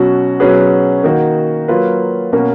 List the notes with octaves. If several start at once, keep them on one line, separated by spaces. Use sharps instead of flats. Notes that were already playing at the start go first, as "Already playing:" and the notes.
Already playing: B2 F#3 C#4 F#4
B2 F#3 C#4 G#4 B4
D#3 A#3 D#4 F#4
F#3 A#3 F4 B4
B2 A#3 C#4 F#4 A#4